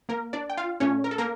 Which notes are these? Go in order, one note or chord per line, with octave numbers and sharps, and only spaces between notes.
A#3 A#4
D4 D5
G5
F4 F5
A#2 A3 C#4 D4 C#5
A#4
A4
A#3 A#4